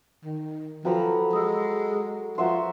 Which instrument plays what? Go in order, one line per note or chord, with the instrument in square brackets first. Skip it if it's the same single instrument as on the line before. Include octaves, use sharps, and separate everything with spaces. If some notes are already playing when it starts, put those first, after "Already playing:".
[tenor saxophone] D#3
[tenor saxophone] F3 [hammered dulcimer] F#3 A#5 B5 [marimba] F#4 B4 G5 [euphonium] A4
[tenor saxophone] G#3 [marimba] D#6 E6
[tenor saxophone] F3 [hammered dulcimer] F#4 E5 C6 [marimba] C5 F#5 A#5